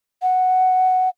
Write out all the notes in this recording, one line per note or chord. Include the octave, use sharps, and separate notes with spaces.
F#5